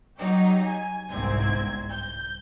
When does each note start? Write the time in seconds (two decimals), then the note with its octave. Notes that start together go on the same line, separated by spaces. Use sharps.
0.19 F#3 G3 D#4 G4
0.65 G#5
1.11 G1 C2 G#2 C4 G#6
1.91 G6